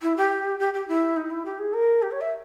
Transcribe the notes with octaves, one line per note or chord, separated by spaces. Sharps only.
E4
G4
G4
G4
E4
D#4
E4
G4
G#4
A#4
G4
C#5
E5